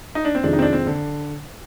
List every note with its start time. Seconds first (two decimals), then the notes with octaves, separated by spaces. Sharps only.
0.15 D#4
0.25 D4
0.35 C4
0.43 F2 C3 D#3 G#3 D4
0.53 D#4
0.59 C4
0.62 D4
0.73 C4
0.87 D3